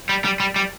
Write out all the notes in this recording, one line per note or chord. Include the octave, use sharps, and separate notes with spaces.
G3
G3
G3
G3